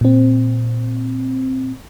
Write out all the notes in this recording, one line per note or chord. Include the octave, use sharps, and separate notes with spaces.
A#2 C4